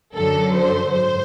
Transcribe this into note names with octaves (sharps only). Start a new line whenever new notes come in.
F#2 D3 F#3 A4
C5
G#2 C5